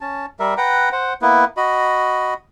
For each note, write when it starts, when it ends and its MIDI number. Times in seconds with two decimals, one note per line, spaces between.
0.01 0.26 61
0.01 0.26 81
0.40 0.54 55
0.40 0.54 70
0.40 0.54 76
0.57 0.89 71
0.57 0.89 78
0.57 0.89 79
0.57 0.89 82
0.92 1.13 72
0.92 1.13 78
1.22 1.45 58
1.22 1.45 59
1.22 1.45 64
1.22 1.45 71
1.57 2.34 66
1.57 2.34 75
1.57 2.34 83